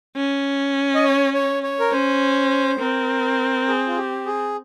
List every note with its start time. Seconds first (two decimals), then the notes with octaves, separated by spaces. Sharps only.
0.16 C#4
0.95 D#5
1.04 C#5
1.34 C#5
1.63 C#5
1.80 A#4
1.92 C#4 C5
2.79 C4 A#4
3.68 G#4
3.87 F4
3.97 G4
4.26 G#4